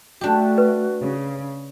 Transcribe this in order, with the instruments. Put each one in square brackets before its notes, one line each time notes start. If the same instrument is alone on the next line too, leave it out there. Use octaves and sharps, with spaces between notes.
[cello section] A3 [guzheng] D4 G4 [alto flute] F#4
[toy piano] B4
[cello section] C#3